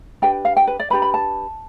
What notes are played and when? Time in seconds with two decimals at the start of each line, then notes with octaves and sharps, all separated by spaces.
0.22 D4 G4 B4 G5
0.45 F5
0.57 G5
0.67 B4
0.80 D5
0.90 D4 G4 B4 B5
1.02 B5
1.14 A5